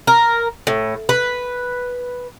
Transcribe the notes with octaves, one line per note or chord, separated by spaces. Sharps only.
A#4
A2
B4